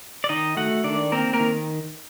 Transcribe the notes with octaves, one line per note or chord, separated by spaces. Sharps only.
D5
D#3 D#4 D#5
A3 F#4 F#5
D#3 D4 D5
A#3 C4 A#4
A#3 A#4
D#3